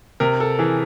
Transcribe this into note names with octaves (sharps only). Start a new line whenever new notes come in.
C3 A#4
A4
E3 G#4